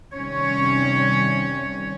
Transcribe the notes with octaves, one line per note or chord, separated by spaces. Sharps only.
C3 D#3 G3 C#4 C#5